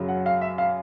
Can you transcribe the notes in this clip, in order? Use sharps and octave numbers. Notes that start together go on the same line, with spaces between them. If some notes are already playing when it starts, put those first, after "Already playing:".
Already playing: F#2 C#3 F#3
F#5
F5
E5
F5